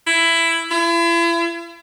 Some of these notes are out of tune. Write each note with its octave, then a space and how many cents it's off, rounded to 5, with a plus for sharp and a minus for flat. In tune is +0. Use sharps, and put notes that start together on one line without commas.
E4 +10
E4 +40